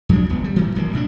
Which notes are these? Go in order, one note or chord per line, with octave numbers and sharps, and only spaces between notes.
E2 F3 F#3 D4
D1 G#1 B3
G3
A2 E3
D1 C2 F#3 A#3
B1 A2 D4